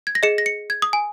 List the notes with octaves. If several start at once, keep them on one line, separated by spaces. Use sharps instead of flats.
G#6
A#6
G#4 D#5 C#7
A#6
C#7
G#6
D#6
G#5